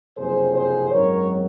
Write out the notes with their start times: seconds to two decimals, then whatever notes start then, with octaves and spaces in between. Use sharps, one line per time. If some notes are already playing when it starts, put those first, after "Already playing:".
0.17 F#1 F2 C3 F#3 G#4 C5
0.54 G#4 C5
0.91 G#1 F#2 D#3 F#3 A#4 C#5